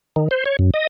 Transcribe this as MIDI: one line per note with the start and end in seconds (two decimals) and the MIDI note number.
0.16 0.28 51
0.31 0.44 72
0.45 0.57 73
0.59 0.71 42
0.74 0.87 75